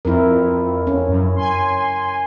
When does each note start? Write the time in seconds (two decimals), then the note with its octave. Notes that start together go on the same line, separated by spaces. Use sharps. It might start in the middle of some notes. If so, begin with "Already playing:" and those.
0.05 F2 E4 A#4
0.87 C#4
1.08 F#2
1.36 G#5 C6